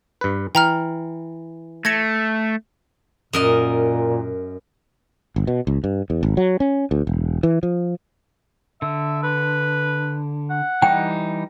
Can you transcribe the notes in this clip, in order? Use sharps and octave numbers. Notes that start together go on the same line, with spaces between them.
G2 B4
E3 G5 A#5 F6
A3 G#6 A#6 C#7
F#2 A#2 A#4 D#5
G1
B2
C#2
G2
E2
G#1
F#3
C#4
D2
E1
E3
F3
D3 E5
B4
F#5
E3 G3 D#4 G5